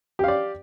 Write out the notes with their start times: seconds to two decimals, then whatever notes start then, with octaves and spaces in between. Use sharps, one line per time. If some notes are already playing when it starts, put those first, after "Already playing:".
0.19 G4
0.24 F5
0.28 D5